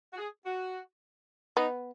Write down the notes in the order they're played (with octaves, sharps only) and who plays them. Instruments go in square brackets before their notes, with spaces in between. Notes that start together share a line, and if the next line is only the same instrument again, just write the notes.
[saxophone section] F#4
G#4
F#4
[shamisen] B3 [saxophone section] D#4